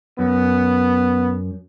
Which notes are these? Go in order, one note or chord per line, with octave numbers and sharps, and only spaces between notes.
F#2 B3